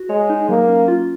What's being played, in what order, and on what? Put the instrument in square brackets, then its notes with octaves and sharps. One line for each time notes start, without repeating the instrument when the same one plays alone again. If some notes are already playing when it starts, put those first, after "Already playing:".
Already playing: [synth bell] F#4
[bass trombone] G#3 [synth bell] C#5
[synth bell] D#4
[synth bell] F#3 [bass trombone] A#3
[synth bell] C#4
F4